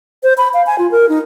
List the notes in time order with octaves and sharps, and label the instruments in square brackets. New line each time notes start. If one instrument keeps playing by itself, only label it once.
[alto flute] C5
B5
F5
G#5
F4
A#4
D#4